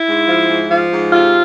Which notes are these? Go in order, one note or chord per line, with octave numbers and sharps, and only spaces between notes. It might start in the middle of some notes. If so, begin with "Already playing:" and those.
Already playing: E4
G#2
F3
G#2
F3
G#2
C3 F4